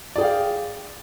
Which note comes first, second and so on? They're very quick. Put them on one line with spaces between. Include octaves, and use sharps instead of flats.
D5 G#4 G5 F5